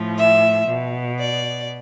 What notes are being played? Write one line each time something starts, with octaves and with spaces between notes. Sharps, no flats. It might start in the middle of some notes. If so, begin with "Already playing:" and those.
Already playing: A2 F3
E5
B2
D5